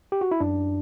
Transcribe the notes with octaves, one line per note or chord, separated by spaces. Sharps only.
G4
F#4
E4
F#2 D4